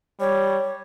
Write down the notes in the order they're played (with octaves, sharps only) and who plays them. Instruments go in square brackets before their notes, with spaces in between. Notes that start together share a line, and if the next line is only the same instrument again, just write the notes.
[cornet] G3 [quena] C#5